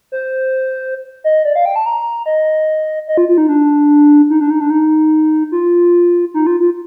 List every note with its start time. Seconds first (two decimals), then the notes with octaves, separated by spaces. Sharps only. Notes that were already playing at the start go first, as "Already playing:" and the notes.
0.12 C5
1.24 D#5
1.45 D5
1.56 F5
1.66 G5
1.76 A5
1.86 A#5
2.26 D#5
3.08 D#5
3.17 F4
3.29 F4
3.38 D#4
3.48 D4
4.30 D#4
4.41 D4
4.50 D#4
4.61 D4
4.70 D#4
5.52 F4
6.34 D#4
6.47 F4
6.60 F4